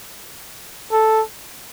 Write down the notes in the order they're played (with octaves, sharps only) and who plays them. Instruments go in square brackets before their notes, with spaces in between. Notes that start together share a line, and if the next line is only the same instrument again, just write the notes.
[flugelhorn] A4